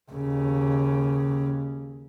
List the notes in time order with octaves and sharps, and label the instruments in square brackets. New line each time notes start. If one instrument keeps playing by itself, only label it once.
[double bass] D#2 C#3